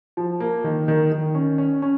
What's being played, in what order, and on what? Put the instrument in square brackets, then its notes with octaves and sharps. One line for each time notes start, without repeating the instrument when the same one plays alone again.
[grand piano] F3
A#3
D#3
D#3
D#3
C#4
C#4
C#4